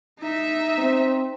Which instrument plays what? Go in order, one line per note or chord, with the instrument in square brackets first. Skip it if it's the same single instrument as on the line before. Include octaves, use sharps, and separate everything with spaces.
[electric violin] D#4 E5
[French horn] C4